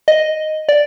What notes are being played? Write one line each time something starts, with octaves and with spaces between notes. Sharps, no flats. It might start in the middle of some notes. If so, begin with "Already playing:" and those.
D#5
D5